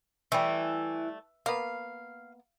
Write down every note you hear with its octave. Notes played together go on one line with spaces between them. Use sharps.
E3 G3 A3
A#3 B3 F5